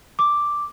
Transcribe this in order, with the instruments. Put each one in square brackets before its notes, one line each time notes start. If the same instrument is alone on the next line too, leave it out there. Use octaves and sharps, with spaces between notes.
[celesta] D6